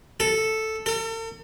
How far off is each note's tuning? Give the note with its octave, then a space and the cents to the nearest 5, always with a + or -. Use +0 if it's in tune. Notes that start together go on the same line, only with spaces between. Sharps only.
A4 +0
A4 +45